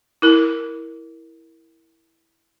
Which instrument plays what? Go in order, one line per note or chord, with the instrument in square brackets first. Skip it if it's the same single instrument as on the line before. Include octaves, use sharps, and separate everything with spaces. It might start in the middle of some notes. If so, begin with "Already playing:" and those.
[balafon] E4 A#4